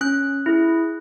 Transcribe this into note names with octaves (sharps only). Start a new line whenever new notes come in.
C#4 F#6
E4 G#4